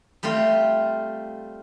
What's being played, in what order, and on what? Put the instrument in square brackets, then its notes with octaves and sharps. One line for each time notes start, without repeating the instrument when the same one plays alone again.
[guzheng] G3 A3 C4 F4